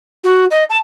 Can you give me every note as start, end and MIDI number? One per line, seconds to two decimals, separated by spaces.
0.24 0.45 66
0.50 0.63 75
0.69 0.77 81